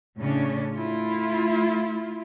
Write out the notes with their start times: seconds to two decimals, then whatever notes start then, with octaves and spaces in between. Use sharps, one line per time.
0.18 A2 C#3 C#4 D4
0.74 A3 E4 F4